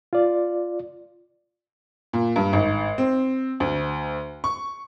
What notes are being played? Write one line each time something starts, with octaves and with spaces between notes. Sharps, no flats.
F4 D5
A#2
G2
G#1
C4
D2
C#6